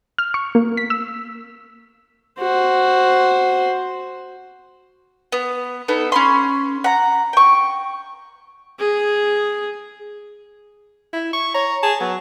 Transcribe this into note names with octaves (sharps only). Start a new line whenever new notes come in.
F6
C#6
A#3
B6
E6
F#4 C5
B3
B3 D#4 A4
C#4 B5 C6
F#5 A#5
G5 C#6
G#4
E4
C#6
C#5 A#5
G#4 A5
F#3 B3